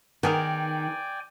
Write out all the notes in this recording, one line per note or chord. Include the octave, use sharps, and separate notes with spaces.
D#3 B3 G#4 A#4 D5 G5 G#5